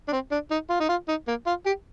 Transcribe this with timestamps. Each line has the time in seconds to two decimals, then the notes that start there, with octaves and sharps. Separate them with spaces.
0.08 D4
0.12 C4
0.31 D4
0.51 D#4
0.70 F4
0.80 D#4
0.89 F4
1.08 D#4
1.28 A#3
1.46 F4
1.66 G4